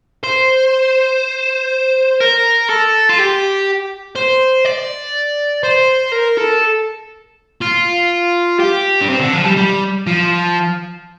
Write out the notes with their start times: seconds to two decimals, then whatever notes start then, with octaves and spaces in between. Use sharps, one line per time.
0.23 C5
2.20 A#4
2.69 A4
3.09 F4
3.19 G4
4.16 C5
4.65 D5
5.63 C5
6.12 A#4
6.38 A4
7.61 F4
8.60 G4
9.01 D4
9.08 C4
9.20 D3
9.33 F3
9.45 G3
9.57 G3
10.07 F3